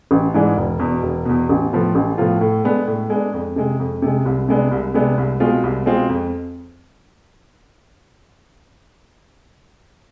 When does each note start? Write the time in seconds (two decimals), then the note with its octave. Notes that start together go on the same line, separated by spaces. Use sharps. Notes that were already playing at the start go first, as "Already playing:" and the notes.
0.11 A1
0.34 G#2 E3 G#3 D4
0.56 E1
0.80 E2 B2
1.03 E1
1.25 E2 B2
1.49 A1
1.72 A2 F3 B3 F4
1.95 A1
2.18 A2 F3 B3 F4
2.41 A2
2.64 G#3 B3 D4
2.87 A2
3.10 G#3 B3 D4
3.34 F2
3.56 C3 G#3
3.80 F2
4.02 C3 G#3
4.26 C2
4.48 C3 G#3 B3 D4
4.71 C2
4.94 C3 G#3 B3 D4
5.18 C2
5.40 B2 G#3 C4 F4
5.64 C2
5.86 B2 G#3 C4 F4
6.09 F2